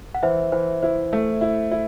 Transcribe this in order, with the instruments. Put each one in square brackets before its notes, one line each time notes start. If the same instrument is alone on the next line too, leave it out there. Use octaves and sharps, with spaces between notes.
[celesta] F#5
[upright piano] E3 [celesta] C5 E5
[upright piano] E3 [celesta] C5
[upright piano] E4 [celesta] C5
[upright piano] A3
E4
E4